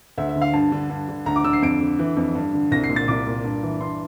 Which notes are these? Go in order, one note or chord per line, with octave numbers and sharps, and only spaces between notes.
D2 E5
E5
D3
F5
G2 A5
D3
G2
D3
D2 A#5
D6
D3 E6
C7
F2 D7
D3
E3
F2
G2
D3
C2 A#6
C7
A#2
A6
C2 D6
A#2
G2
E3
G2 C6